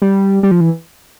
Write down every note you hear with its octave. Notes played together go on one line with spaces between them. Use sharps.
G3
G3
F3
E3